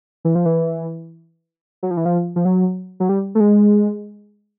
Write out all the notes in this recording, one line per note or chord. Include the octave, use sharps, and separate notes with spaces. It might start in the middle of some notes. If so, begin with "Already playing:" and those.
E3
F3
E3
F#3
F3
E3
F3
F3
F#3
F#3
G3
A3
G#3